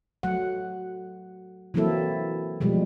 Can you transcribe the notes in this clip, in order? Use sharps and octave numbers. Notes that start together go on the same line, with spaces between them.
F#3 A3 F#5
E3 F#3 A#3 C4 E4 A4
B2 F3 G3 G#3